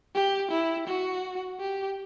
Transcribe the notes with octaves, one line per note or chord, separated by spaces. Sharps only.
G4
E4
F#4
G4